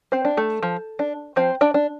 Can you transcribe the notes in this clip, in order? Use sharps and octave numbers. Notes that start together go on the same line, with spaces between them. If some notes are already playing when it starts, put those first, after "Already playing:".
C4 C5
D4
A3 A4
F3
D4
F3 C4 C5
D4 D5
D4